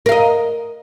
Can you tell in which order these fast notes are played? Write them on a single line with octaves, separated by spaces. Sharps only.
A#4 F5 D#5